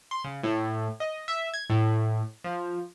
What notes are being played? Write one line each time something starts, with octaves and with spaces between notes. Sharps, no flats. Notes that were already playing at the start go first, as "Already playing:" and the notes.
C6
C#3
A2
D#5
E5
G#6
A2
F3